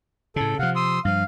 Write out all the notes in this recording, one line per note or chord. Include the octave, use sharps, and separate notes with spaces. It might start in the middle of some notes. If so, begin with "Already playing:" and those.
A2 C#3 A4
C3 F3 F5 F#5
C6 D#6 E6
G2 F3 F5